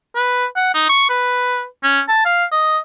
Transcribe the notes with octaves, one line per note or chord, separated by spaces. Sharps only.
B4
F#5
D#4
C#6
B4
C#4
A5
F5
D#5